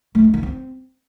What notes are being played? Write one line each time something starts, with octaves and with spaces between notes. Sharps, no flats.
A3
D#4
D#3
C4